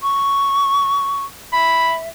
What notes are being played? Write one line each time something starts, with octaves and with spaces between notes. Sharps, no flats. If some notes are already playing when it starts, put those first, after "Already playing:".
C#6
E5 B5